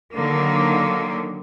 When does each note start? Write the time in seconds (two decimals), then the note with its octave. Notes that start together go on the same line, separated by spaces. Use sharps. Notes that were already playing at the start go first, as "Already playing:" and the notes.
0.14 D3 D#3 F#3 A#3